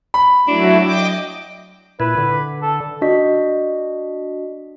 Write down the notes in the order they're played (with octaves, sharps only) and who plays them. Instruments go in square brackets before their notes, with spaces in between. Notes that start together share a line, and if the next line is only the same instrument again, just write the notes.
[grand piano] B5
[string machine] F#3 [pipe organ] A3 E4 F#4 [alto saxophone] D4
[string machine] D#5 [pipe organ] G5 D6
[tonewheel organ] A#2 E4 [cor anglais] B4
[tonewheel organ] D3
[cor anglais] A4
[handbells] D4 F#4 D5 D#5 B6